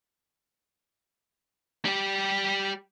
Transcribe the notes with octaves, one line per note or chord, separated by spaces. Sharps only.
G3 G4